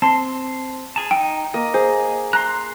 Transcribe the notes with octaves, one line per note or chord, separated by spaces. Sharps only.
C4 A5 C6
G#4 A5
D#4 G5
A#3 D#5
G#4 C5
A#5 C6 F#6